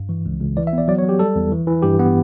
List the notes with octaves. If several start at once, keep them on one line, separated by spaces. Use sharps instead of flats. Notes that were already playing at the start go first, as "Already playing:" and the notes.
Already playing: G2
E3
C#2
C#2
E3 D5
E5
B3 D5
F#3 D5
C#5
F#3 G4
G3 A4
E2
E3
E3
G2 G4
B3